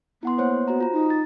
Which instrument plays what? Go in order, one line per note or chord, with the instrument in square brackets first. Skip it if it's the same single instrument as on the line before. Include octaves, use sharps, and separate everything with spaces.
[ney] B3 [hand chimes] E4 F#5 C6
[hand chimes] A#3 C5 C#5
F#4 C5 A#5
F4 A#5
[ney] D#4
[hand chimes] A6